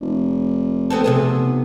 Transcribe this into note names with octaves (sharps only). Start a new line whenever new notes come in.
F1
B3 C4 A4
C3 B3 G#4